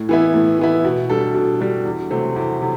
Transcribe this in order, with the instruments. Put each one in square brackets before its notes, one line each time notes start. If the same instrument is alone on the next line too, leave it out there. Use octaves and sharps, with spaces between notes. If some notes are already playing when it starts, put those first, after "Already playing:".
Already playing: [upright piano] A2
E3 B3 E4
A2
E3 B3 E4
B2
G3 D4 A4
B2
G3 D4 A4
E2
C3 F#3 A3 C4
E2
C3 F#3